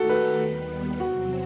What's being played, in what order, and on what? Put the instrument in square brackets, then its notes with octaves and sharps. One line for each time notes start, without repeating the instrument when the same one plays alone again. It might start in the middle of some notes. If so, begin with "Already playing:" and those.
Already playing: [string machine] D#3 A3 D#4 G4 [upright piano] F#4 A4
[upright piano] B4
[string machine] D#2 D#3 G3 B3
[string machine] E2 C3 F#3 C4 [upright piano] F#4